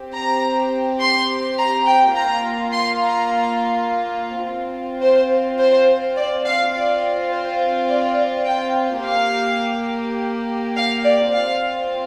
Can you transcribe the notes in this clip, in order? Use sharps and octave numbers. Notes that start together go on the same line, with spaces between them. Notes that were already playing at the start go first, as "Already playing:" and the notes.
Already playing: C4 G4
A#5
C6
A#5
G5
A#3 F4 A#5
C6
A#5
C4 F4
C5
C5
D5
F5
C4 F4 D5
C5
D5
G5
A#3 G4 F5
F5
D5
C4 F4 F5